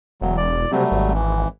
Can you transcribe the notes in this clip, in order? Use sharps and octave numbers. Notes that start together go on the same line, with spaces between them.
E1 F#3
D5
C3 F#3 G3 A3
G#1
E3